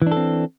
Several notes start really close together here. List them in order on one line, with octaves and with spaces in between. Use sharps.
E3 D4 A4 C4